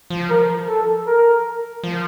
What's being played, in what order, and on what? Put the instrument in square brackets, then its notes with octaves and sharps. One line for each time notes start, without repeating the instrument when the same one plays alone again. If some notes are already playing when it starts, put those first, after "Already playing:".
[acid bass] F3
[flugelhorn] A#4
A4
A#4
[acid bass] F3